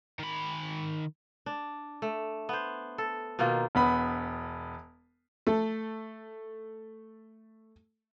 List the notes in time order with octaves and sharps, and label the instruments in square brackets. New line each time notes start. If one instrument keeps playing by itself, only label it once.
[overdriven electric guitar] D#3 B5
[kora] D4
A3
B3 C5
A4
B2 D#3 A#3 F4
[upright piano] E1 B3 B5
[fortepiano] A3 A4